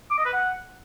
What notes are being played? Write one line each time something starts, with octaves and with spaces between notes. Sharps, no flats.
D6
D#5
B4
F#5